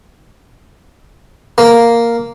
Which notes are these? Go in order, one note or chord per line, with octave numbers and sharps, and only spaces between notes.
A#3